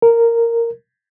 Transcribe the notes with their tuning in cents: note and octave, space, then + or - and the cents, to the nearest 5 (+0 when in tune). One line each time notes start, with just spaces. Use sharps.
A#4 -10